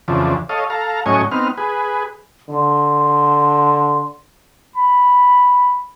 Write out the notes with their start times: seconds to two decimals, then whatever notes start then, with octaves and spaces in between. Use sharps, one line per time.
0.08 F2 C#3 E3 F3 D4
0.49 A4 C#5 D#5 F5
0.70 A4 F5 A#5
1.06 A2 F#3 C#4 D#5 G#5 C#6
1.31 B3 C4 D#4 F6
1.58 G#4 B4
2.49 D3 C6
4.76 B5